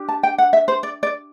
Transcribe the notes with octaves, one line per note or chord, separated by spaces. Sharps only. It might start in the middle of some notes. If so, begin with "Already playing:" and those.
Already playing: D4 G4
A5
G5
F#5
E5
C5
D5
D5